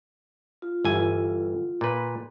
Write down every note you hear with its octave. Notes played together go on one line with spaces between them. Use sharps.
F4
G1 E3 G#5
A#2 B4